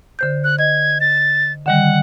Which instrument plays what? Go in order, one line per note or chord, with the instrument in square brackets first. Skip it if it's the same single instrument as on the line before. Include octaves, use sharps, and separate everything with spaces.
[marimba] D3 C5 G6
[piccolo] F#6
[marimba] D#5 [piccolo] G#6
[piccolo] A6
[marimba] D3 D#3 G3 [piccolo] F#5